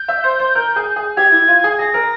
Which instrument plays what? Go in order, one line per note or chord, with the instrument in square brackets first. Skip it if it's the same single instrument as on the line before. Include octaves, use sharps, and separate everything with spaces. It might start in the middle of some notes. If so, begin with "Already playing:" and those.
Already playing: [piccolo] G6
[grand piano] E5
C5
C5
A#4
G#4
G#4
[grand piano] G4 [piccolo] G#6
[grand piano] E4
F4
G#4
[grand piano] G#4 [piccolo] A#6
[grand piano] A#4